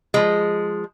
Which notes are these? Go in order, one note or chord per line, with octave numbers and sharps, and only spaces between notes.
F3 G#3